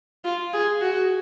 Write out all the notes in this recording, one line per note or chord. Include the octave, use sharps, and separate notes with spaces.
F4
G#4
F#4